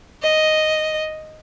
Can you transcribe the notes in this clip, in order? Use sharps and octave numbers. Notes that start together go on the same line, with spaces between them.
D#5